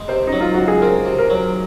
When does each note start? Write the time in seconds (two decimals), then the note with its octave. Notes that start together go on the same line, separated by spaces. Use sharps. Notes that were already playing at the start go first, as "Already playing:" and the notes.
Already playing: G#3
0.08 C3 C5
0.27 D#4
0.32 F#3
0.41 F4
0.54 C#2 F#4
0.68 G#4
0.82 C4 A#4
1.05 C3
1.18 A#4
1.30 F#3